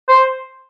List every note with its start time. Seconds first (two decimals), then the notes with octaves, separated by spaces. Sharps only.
0.08 C5